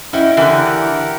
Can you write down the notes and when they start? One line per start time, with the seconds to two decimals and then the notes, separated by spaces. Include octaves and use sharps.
0.13 C#4 E4 D#5 F#5 G5
0.37 D3 E3 G4 A#4 F#5